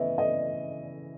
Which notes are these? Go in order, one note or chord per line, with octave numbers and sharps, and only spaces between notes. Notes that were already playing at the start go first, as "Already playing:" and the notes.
Already playing: C#3 E3 B3 D#5 E5
D#5